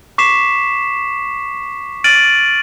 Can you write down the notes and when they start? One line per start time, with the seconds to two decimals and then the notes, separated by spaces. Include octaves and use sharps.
0.18 C#6 D6 B6 C7 E7
2.04 F6 A6 D7 D#7 F#7